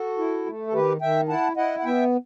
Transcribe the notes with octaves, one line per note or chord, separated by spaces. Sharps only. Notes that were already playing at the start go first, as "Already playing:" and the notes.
Already playing: F#4 A4
E4
A3
A4
D#3 G4 B4
D#3 E5 G5
E4 F#5 A5
E4 D#5 F#5
F#5
B3 E5 G5